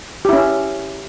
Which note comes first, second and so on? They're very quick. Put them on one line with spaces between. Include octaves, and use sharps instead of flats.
G4 E4 C#4